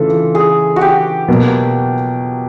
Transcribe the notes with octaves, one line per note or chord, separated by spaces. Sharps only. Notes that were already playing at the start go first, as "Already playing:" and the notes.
Already playing: C#3 E3 A3 D4 F4 A4
G#4
F#4
G4
B2 F#3 A#3